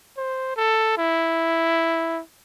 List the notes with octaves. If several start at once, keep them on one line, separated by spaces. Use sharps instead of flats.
C5
A4
E4